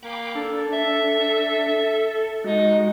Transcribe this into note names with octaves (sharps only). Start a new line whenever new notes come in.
A#3 G5 B5 D6
D4 A4
E5
G#3 D#4 F#4